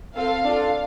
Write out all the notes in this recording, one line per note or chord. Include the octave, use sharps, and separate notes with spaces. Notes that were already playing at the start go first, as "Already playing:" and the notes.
C4 F4 A4 F5
D4 F4 A4